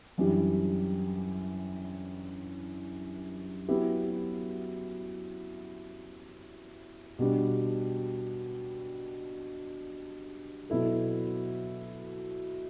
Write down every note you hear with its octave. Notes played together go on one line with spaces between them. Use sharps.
F#2 E3 G3 D4
F#3 B3 E4 G4
B2 G3 D4
B2 F#3 B3 E4 A4